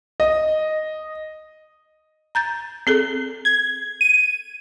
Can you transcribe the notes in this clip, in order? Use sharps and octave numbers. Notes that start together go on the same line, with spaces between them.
D#5
A#5 G6 A6
C4 G#4 A4
G#6
D#7